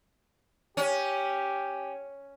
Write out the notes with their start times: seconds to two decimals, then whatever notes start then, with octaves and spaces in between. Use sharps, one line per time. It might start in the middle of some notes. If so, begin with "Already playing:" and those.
0.77 C#4 G4